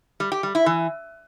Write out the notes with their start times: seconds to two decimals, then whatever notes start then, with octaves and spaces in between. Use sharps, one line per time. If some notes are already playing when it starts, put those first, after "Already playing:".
0.20 G3
0.32 G4
0.43 G3
0.55 E4
0.66 E3